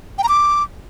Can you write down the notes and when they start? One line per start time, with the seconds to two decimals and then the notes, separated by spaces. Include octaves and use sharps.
0.18 G5
0.23 A#5
0.29 D6